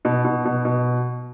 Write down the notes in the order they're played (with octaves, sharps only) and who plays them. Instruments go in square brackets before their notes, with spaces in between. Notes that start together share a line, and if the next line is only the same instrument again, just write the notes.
[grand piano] B2
B2
B2
B2